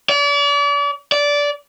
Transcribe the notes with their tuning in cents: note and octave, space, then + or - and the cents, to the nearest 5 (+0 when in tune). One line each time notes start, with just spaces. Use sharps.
D5 -40
D5 -15